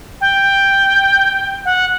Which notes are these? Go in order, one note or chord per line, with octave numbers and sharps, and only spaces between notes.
G5
F#5